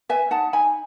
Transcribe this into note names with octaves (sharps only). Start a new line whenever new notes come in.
B4 E5 G#5
D#4 F#5 A5
D#4 G#5 B5